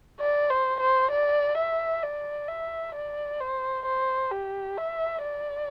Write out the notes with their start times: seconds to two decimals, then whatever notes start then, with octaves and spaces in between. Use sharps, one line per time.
0.20 D5
0.50 C5
0.80 C5
1.11 D5
1.57 E5
2.03 D5
2.48 E5
2.95 D5
3.40 C5
3.85 C5
4.32 G4
4.77 E5
5.23 D5